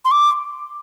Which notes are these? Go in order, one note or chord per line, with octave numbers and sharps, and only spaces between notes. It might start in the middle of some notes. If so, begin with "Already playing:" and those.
C6
D6